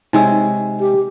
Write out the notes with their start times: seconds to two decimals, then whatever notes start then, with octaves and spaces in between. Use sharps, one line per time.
0.13 C3 G#3 D#4 C#5 G#5 E6
0.80 G4